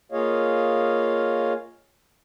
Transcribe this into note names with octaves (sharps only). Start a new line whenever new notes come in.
A#3 F4 G#4 C#5 D#5 F5